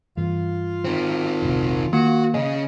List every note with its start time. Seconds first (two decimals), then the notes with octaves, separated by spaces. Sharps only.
0.17 G2 E3 F4
0.85 D#3 C4
1.42 F1 A#1 C3
1.93 D#3 A#3 F#4
2.34 C#3 G#4 D#5